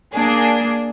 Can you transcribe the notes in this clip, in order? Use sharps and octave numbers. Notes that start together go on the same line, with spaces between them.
A#3 D4 G#4